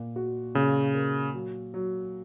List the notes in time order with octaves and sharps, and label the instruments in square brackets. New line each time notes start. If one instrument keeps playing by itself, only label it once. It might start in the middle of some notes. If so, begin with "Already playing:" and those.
Already playing: [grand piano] A#2
F#4
[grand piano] A#2 [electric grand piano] C#3
[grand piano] A#4
F#3
F#3